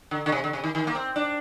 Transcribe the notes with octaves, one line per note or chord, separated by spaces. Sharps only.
D3
D3
C3
D3
C3
D#3
D#3
A#3
C4
D4